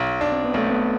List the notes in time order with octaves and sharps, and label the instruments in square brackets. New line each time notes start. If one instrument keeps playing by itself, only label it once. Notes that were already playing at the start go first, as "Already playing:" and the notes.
Already playing: [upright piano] B1
D4
[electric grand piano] C4
B3
[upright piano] B1 [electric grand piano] A3
[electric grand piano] B3